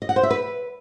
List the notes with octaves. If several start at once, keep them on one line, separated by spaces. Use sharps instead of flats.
D#5
F#5
C5
E5
B4